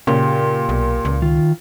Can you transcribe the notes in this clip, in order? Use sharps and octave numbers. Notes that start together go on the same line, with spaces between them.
A#2 C#3 G4
B1
C#2
D#3 F4